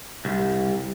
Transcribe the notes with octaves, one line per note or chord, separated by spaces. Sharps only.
C2